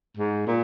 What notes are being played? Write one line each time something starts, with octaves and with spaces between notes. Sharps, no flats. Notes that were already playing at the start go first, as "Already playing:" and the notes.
G#2
A#2